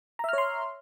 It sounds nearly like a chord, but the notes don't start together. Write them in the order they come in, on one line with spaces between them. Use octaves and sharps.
A#5 E5 F6 C#5 C6